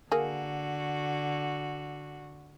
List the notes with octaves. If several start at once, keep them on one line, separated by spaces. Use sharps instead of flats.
D3 A#3 F#4 G#4